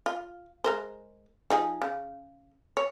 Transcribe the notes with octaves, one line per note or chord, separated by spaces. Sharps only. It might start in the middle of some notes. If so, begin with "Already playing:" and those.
F4
G#3 A#4 C5
F3 D#4 G#4
C#3
C#5